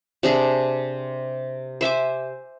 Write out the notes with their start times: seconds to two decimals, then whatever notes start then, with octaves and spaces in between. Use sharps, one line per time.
0.23 C3 D4 G#4
1.81 C5 E5 G#5 D6